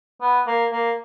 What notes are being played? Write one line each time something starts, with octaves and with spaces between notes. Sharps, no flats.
B3
A#3
A#3